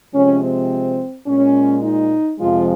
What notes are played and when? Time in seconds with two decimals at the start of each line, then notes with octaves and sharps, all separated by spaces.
0.13 C3 F3 G#3 C#4
0.42 C4
1.26 A#2 G#3 C#4
1.83 D#4
2.39 F2 C3 F3 G#3 F4